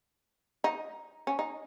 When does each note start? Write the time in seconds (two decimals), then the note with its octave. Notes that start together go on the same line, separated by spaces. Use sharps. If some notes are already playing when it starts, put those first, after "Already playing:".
0.64 D#4
1.27 C#4
1.39 D#4